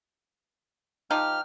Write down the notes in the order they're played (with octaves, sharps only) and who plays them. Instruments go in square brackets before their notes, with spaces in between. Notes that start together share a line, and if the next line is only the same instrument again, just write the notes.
[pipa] F3 D#4 G4 [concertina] F6